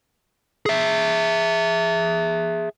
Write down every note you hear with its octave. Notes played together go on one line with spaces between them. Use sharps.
G#4 E5